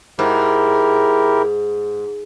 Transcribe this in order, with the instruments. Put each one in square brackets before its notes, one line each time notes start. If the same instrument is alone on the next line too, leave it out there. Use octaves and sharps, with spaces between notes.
[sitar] G#2 [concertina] E4 G4 A#4